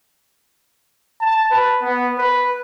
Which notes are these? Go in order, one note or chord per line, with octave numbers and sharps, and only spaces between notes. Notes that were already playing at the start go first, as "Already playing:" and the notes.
A5
B4
B3
B4